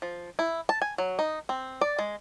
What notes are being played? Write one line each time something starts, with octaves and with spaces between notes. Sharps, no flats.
F3
E4
A5
G#5
F#3
D#4
C4
D5
G#3